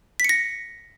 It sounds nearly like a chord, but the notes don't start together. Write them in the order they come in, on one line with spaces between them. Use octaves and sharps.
B6 C#7 A#6